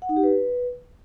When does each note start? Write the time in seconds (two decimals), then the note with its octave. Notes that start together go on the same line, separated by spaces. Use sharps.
0.02 F#5
0.09 D#4
0.16 G4
0.24 B4